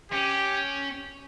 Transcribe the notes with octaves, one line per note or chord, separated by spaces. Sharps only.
C#4 G4